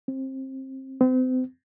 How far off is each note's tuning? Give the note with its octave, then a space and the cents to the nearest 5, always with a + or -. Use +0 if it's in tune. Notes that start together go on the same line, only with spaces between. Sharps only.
C4 +25
C4 -35